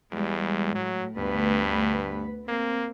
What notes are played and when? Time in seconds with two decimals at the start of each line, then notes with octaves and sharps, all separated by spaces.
0.12 E2 G3 G#3
0.75 A2 F#3
1.18 D2 G2 B3 B4
2.48 A#3 C4